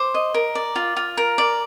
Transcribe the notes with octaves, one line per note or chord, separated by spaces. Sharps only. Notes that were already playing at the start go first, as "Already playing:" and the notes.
Already playing: C5 D6
D#5
A#4
D5
F4
F4
A#4
D5